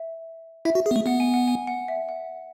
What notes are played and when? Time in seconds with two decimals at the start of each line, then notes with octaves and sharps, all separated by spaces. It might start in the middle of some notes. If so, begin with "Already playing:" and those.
Already playing: E5
0.65 E4 E5
0.75 F#4
0.86 G#4
0.91 B3
0.96 A3
1.06 B3 F#5
1.20 G#5
1.34 F#5
1.48 G#5
1.67 F#5
1.88 E5
2.09 F#5